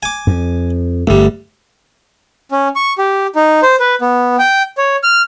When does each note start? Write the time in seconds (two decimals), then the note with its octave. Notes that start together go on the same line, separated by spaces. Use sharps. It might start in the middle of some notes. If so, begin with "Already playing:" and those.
0.03 G#5 D6
0.27 F2
1.07 G1 D2 G3 A3
2.51 C#4
2.76 C#6
2.98 G4
3.35 D#4
3.63 C5
3.80 B4
4.01 B3
4.39 G5
4.78 C#5
5.03 F6